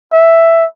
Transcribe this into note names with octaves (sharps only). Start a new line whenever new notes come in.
E5